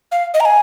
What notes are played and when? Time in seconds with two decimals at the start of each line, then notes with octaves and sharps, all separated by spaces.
0.12 F5
0.34 D#5
0.40 A#5
0.45 G#5